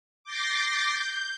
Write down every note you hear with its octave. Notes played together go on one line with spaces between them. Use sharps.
D6 G6 A6 A#6 C7
G6